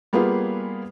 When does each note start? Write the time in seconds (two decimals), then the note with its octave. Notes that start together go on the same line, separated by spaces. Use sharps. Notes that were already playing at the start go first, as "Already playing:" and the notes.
0.13 G3 A#3 B3 F4 G#4 B4